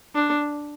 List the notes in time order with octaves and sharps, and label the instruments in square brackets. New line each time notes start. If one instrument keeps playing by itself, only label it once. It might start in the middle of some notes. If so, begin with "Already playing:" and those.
[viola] D4